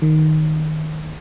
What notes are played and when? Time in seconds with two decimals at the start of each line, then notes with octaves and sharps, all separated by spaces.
0.02 D#3